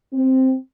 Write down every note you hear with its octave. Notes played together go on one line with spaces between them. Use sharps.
C4